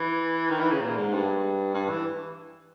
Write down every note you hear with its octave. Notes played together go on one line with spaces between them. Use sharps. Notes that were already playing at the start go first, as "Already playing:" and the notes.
Already playing: E3
D#3
E3
C#3
A#2
G#2
G2
G2
E3